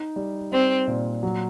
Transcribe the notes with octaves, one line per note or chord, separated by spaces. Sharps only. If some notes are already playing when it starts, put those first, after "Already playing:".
Already playing: D#4
G3
G3 C4
A#2
F#3